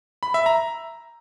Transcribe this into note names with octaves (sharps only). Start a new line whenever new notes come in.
B5
E5
A#5